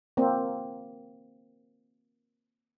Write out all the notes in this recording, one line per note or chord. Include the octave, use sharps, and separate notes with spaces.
A#3 C4